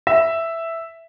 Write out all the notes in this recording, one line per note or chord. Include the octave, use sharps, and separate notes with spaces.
E5